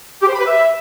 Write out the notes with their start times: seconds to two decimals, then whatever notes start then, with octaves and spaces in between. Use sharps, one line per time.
0.22 G4
0.28 C5
0.34 B5
0.40 B4
0.46 E5